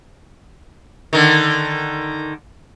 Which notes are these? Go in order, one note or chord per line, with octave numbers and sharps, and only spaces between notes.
D3 D#3